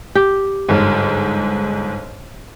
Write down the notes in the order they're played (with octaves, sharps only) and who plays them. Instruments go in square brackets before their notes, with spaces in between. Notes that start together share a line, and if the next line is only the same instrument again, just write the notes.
[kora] G4
[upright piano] G1 G#2